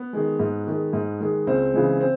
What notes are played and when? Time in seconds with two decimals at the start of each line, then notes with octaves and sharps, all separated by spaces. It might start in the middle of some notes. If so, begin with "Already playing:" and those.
Already playing: B3
0.13 D#3 G#3
0.39 G#2
0.67 D#3 G#3
0.93 G#2
1.20 D#3 G#3
1.47 C#2 C4
1.74 C#3 E3 G#3
2.00 C4